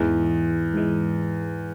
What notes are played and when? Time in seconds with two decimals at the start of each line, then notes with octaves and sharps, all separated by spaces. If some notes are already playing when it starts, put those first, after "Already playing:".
Already playing: E2 G#2 E3 G#3
0.74 G#2 E3 G#3